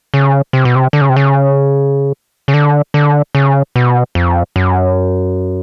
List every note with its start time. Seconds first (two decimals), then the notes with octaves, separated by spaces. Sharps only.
0.14 C#3
0.53 C3
0.65 B2
0.75 C3
0.93 D3
1.01 C#3
1.09 C3
1.16 C#3
2.48 C#3
2.54 D3
2.94 D3
3.35 C#3
3.76 B2
4.15 F2
4.56 F#2